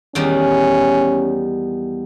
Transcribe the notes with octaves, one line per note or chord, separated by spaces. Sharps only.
E2 D#3 G3 C#4